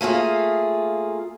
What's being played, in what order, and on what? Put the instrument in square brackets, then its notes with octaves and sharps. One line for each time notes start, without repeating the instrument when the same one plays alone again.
[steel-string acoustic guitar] A3 A#3 F4 G#4